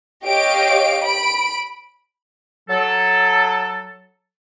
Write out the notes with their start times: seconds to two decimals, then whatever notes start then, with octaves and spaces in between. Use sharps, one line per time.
0.24 G4 C#5 D#5 F5 D7
1.03 B5 D7
2.69 F#3 A4